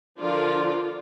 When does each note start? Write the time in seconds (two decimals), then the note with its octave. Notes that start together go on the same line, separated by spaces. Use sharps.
0.20 D3 F3 D4 F4 A#4 D5